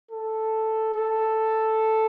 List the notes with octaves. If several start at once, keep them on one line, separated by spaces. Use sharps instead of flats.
A4
A4